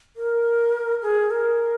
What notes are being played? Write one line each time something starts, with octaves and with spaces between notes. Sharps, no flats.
A#4
G#4
A#4